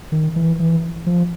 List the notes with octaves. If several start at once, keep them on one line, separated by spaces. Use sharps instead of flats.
D#3
E3
E3
F3